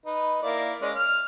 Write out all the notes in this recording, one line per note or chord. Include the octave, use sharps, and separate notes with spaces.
D#4 B4
A#3 E4 D5
G#3 C#4 D5
F6